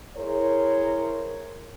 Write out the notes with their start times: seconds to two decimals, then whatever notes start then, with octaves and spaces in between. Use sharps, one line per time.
0.16 E4 G#4 A#4 C5 C#5